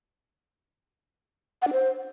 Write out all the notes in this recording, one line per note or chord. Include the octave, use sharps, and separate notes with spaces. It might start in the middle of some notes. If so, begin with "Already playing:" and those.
F#5
D4
C5